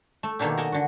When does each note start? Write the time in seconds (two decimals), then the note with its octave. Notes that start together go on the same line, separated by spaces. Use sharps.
0.23 A3
0.39 B2 D#3 A3 A#3 D4 G4
0.57 A#4 D#5 F#5 G#5 A5
0.72 D3 F#4